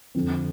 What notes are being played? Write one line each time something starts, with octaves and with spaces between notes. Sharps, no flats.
F2 D3 F3 C4